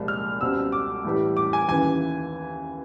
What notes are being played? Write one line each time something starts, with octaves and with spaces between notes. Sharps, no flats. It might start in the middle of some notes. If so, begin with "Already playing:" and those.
Already playing: C2 A#2 F3 G#3
F6
C#2 B2 G3 C4 E6
D6
A2 E3 G3
D6
G#5
D#2 C#3 E3 G#5